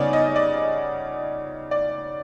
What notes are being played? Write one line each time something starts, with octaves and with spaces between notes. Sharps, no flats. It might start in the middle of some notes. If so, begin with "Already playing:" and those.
Already playing: C#3 G3 B3 D#4 C#5 D5
D#5
D5
D5